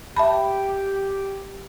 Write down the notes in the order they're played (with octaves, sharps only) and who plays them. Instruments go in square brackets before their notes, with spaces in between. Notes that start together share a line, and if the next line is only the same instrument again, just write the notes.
[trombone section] G4 [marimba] E5 A5 B5